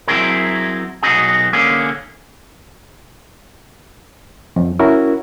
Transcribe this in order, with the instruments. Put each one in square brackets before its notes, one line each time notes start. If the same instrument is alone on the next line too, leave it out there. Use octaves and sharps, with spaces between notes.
[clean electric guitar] F#3 C4 E4 G#4 A#4
B1 G2 B3 D#4 F#4 G#4
D3 A#3 C#4 G#4
[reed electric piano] F2
C#4 E4 F#4 A#4